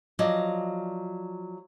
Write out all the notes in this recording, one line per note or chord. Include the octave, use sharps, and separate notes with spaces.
F3 F#3 D5 D#5